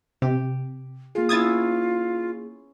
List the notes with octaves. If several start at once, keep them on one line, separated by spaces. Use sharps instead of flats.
C3 G4
A#3 F4 G#4
B3 C#4 E4 D#6 G#6 A6